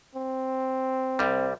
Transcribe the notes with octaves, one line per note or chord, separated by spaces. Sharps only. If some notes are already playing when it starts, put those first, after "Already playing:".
C4
C2 G3